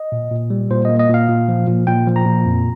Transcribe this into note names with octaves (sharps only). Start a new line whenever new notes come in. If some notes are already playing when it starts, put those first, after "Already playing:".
Already playing: D#5
A#2
A#2
G3
A#2 C5
A#3 D#5
D#5
A#2
F5
A#2
F3
A#2
A#2 G5
F3
A#5
A#2
F2